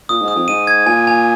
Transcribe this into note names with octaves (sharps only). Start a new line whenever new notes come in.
A#2 D#6
G#2
D#6
F2
G#2 D#7
G#6
A#2 G#5
G#5